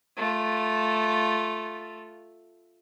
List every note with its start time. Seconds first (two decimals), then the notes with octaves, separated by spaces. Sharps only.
0.17 A3 F4